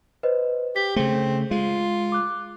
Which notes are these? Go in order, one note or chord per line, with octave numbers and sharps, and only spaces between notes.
B4 C5 D#5
G4 B6
C#3 A3 C4 G#4
G#3 F4
D6 F#6